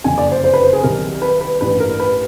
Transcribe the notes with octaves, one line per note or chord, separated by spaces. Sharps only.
F#1 F2 D3 G#5
D5
C5
C5
B4
C5
G#4
C2 C3 D#3 F#3 A#4
B4
B4
A1 G2 E3 B4
A#4
B4